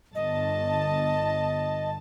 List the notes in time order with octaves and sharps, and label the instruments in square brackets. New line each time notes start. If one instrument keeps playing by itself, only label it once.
[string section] G1 A5 [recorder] D#5